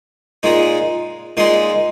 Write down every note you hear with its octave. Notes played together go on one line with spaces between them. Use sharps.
A#2 G#3 D#4
A#2 G#3 D#4 C6